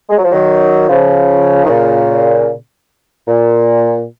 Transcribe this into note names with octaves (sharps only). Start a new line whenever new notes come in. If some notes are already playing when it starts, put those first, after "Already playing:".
G#3
F#3
F3
D#3 F#3
C#3 F3
D#3
A#2 C#3
A#2